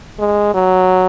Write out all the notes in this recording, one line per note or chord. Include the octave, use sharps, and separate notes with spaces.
G#3
F#3